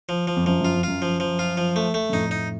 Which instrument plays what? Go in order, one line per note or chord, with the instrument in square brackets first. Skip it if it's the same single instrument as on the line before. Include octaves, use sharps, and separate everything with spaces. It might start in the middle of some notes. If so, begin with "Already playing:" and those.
[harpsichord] F3
F3
[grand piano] F2
[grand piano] F#2 [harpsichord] F3
[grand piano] F#2 [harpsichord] F4
[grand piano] F2
[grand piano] F#2 [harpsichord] F4
[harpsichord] F3
F3
F4
F3
A3
A3
[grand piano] F#2
[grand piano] F2 A2 [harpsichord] D#4
[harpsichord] D#4